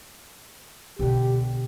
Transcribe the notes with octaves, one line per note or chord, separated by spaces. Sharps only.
B2 D3 G4